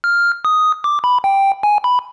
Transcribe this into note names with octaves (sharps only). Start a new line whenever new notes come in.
F6
D#6
D6
B5
G5
G#5
B5